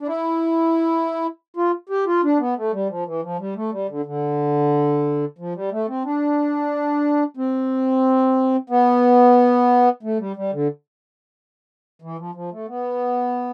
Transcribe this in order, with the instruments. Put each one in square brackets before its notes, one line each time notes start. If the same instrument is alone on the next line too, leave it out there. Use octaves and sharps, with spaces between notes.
[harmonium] D4
E4
F4
G4
F4
D4
B3
A3
G3
F3
E3
F3
G3
A3
G3
D3
D3
F3
G3
A3
C4
D4
C4
B3
A3
G3
G3
D3
E3
F3
F3
A3
B3